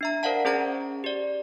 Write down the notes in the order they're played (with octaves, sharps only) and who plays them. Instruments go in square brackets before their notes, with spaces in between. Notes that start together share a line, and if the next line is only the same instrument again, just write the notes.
[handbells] D4 E5 A#5
A#4 C5 D5 F5 F#5 A5
C#4 G#4 C5 A#5 G#6
G4 D5